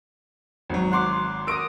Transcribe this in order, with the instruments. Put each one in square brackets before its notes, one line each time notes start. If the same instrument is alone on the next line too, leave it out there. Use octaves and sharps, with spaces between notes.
[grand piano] G#1 F#3
[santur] F#5 C6 D6
[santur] A#4 C#6 D#6 [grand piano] E6 D7